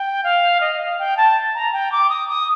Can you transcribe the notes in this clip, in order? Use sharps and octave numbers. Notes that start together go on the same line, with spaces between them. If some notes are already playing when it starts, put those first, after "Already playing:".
Already playing: G5
F5
D#5
F5
G5
A5
A#5
G5
D6
D#6
D#6